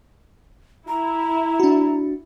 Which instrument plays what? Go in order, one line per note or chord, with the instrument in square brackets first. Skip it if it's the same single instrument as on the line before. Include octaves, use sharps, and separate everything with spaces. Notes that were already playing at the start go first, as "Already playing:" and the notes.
[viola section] E4 [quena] A#5
[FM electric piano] D4 F#4